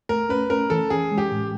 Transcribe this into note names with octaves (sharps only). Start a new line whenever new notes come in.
A3 A#4
C#4 B4
C#4 A#4
E3 A4
C#4 G#4
G#3
G4
A2